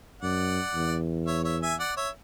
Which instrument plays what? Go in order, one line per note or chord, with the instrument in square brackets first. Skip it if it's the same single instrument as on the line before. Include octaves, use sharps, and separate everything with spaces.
[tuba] F#2 [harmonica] D5 F#5
[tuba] E2
[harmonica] C#5 E5
C#5 E5
E5 G#5
D5 F#5
C#5 E5